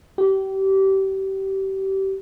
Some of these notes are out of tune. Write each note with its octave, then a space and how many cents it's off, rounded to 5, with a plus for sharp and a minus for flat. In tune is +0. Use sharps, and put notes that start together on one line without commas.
G4 -25